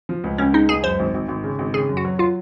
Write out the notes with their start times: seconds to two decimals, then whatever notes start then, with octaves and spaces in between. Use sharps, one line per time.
0.09 F3
0.24 C#2
0.38 C#2 C#4
0.53 G#3 D#4
0.69 C#2 G#4
0.83 F#2 C5
0.99 G#1
1.14 G#1
1.28 G#1
1.44 C#3
1.59 G#1
1.74 C#3 G#4
1.89 F#2
1.97 F#4
2.05 F#3
2.19 F#3 F4